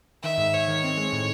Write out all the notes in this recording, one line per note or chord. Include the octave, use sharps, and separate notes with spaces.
D#3 E5
G#2
G#2 C#5
D#3
C4
G#3
A2